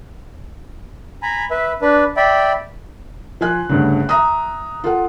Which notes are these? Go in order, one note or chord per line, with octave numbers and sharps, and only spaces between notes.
G#5 A#5 B5
B4 E5
D4 B4
D5 E5 G5 B5
F3 F4 G#5 F#6
D2 G2 C#3
E5 A#5 D#6
F4 A4 F#5